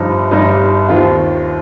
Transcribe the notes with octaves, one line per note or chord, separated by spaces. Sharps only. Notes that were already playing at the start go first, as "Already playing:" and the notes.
Already playing: G1 G2 F3 D#4
G1 G2 G3 D#4
D#2 D#3 C4 F4